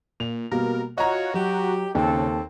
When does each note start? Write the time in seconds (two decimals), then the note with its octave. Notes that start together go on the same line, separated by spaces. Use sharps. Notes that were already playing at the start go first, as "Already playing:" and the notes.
0.20 A#2 F7
0.51 B2 G3 A#3 A#4
0.98 F4 F#4 C#5 D#5 A#5
1.34 F#3 G4
1.95 D#2 C#3 C4 A4